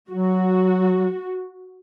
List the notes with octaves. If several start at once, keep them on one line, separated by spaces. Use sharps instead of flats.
F#3 F#4